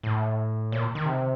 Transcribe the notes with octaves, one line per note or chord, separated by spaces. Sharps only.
A2
A#2
D#3
C3